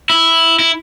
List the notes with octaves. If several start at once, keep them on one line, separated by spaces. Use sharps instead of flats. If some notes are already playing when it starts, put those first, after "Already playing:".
E4
E4